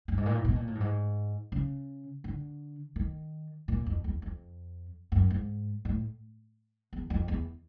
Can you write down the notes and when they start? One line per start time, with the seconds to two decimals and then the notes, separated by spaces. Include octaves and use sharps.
0.08 G2
0.17 G#2
0.26 A#2
0.35 A2
0.45 B2
0.56 A#2
0.67 A2
0.75 G2
0.81 G#2
1.52 C#3
2.24 D3
2.96 D#3
3.68 A#2
3.86 F2
4.04 E2
4.22 F2
5.12 F#2
5.30 G#2
5.85 A2
6.93 E2
7.10 F2
7.28 E2